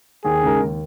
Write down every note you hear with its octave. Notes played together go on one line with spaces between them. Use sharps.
D#2 G#4
C#3 G#3 D#4 A#4
D#2